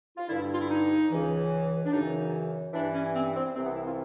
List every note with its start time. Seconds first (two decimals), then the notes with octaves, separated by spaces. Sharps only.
0.17 F4
0.29 G2 D3 E4
0.53 F4
0.61 E4
0.69 D#4
1.11 C#2 C#3 E3
1.85 D4
1.92 F#2 C#3 E3 D#4
2.73 G2 E3 D4
2.94 C#4
3.14 C4
3.35 C4
3.55 C2 C3 E3 C4
3.66 B3
3.76 E4
3.87 F4